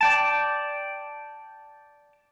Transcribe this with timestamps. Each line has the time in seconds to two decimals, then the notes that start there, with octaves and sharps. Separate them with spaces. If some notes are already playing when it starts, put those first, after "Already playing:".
0.01 D5 G5 A5